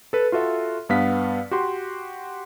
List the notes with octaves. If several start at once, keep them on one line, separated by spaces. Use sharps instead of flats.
A4 B4
F4 F#4 A4 E5
G2 B3 F5 B6
F#4 G4 C6